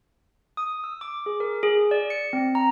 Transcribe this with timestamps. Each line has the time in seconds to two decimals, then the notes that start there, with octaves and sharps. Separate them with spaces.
0.57 D#6
0.84 E6
1.01 D6
1.26 G#4
1.40 A#4
1.63 G#4
1.91 D5
2.10 C#7
2.33 C4
2.55 A#5